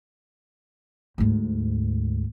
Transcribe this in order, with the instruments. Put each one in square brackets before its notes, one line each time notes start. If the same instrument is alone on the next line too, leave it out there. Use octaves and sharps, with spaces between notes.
[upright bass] D2 G#2